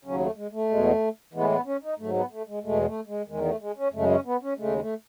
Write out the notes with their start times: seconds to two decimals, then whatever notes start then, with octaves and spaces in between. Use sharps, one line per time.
0.04 D#2 C#3 F#3 C#4
0.20 A3
0.36 G#3
0.52 A3
0.69 E2 B2 G#3
1.33 A2 E3 G#3 B3
1.50 B3
1.66 C#4
1.83 D#4
1.99 G#2 F#3 A3
2.14 B3
2.31 A3
2.48 G#3
2.63 E2 B2 G#3 A3
2.85 A3
3.07 G#3
3.28 E2 D#3 G#3
3.45 A3
3.60 G#3
3.77 C#4
3.93 F#2 C#3 G#3 A3
4.09 C#4
4.25 B3
4.42 C#4
4.58 D#2 C#3 G#3 A3
4.79 A3